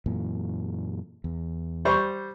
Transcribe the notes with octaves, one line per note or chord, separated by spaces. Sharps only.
F#2 A#2 E3
E2
G3 C5 C#6